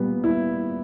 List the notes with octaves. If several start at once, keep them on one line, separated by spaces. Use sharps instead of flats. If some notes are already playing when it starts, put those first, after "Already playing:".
Already playing: A#2 G3 B3
E4